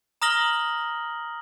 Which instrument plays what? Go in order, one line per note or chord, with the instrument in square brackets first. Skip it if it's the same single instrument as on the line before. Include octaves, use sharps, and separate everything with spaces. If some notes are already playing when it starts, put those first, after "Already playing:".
[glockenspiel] A#5 D#6 F6 A#6 F#7 G7